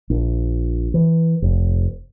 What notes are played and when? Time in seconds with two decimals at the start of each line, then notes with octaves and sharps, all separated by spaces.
0.10 A#1
0.94 E3
1.42 F1